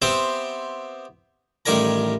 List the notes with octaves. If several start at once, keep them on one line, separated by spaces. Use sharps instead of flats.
B3 C4 G4 C5 E5
A1 D#3 G3 A#4 G#5 A#5